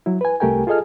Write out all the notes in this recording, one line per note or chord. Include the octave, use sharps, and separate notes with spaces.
F#3 E4
B4 G#5
C2 A3 G4 A#4 G5 G#5
F4 G#4 A4 D#5 G#5 F6